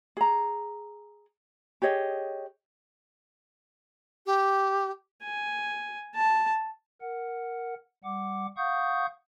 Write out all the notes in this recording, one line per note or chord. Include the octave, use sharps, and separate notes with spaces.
G#4 A#5
G4 G#4 C#5 D#5
G4
G#5
A5
A#4 F#5
G3 F#5 D6
F5 F#5 C#6 D#6 G6